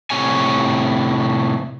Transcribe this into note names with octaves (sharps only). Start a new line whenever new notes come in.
A2 C3 C#5 G#5